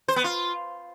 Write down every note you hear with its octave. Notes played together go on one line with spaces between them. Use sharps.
C5
B3
F4